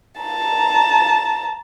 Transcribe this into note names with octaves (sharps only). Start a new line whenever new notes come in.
A5 A#5